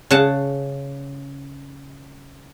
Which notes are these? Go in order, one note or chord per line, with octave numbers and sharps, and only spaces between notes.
C#3 F#5 A5